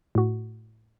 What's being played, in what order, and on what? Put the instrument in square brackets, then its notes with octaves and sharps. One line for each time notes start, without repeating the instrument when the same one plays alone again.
[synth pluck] A2 F#4